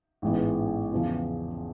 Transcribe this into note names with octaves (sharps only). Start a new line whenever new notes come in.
A1 G#2 E3 G#3 B3
E2 C#3 F3